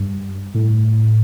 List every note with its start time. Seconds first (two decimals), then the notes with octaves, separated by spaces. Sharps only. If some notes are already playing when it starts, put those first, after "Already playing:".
Already playing: G2
0.54 A2